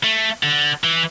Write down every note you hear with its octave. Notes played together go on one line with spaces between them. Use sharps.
A3
D3
E3